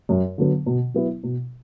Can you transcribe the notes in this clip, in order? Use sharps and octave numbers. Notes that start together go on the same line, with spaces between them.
F#2
D3 F#3 B3
B2
F#3 B3 E4
B2